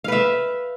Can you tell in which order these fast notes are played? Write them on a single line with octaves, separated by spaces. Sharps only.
F5 B4 E5